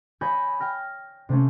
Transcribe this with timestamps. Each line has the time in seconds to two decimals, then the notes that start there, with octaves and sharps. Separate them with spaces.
0.21 C#5 G#5 B5 D#6 G6 A#6
0.60 G5 F6 A#6
1.29 C3 A3 C4 C#4